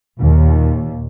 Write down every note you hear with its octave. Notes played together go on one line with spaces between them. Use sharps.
D#2 A#2